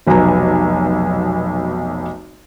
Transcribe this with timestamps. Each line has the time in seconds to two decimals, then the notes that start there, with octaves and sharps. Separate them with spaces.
0.07 F1 B1 F#3 B3 G#5 A#5